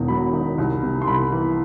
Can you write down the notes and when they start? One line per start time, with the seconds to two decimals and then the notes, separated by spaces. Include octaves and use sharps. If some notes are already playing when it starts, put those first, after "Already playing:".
Already playing: E1 E2 D#3
0.08 F#3 B5
0.33 D#3
0.58 C2
0.83 C3
1.02 C6
1.08 C2 B5
1.32 E3